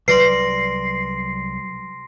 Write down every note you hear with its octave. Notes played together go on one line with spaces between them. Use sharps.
C2 F#3 B4 D5 C6 A#6 C7 D7